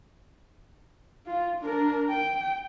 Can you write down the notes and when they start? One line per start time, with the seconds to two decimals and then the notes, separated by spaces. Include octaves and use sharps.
1.26 F4
1.60 D4 A#4
2.09 G5